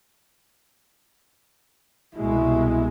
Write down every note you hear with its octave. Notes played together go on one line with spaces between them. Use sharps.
C2 B2 G#3 E4